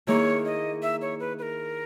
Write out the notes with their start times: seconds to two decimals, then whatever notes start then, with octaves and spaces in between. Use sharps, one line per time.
0.07 D#3 A#3 E4 G#4 C#5
0.45 D#5
0.83 E5
1.02 C#5
1.20 B4
1.39 B4
1.42 A#4